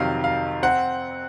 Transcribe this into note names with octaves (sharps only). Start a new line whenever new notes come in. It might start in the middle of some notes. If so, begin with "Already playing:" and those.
Already playing: F2 C3 D#3 F#3 F5
F5
C4 F#5